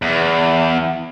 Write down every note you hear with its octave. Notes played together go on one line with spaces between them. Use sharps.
E2